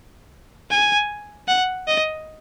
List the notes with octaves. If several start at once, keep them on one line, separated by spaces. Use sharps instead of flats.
G#5
F#5
D#5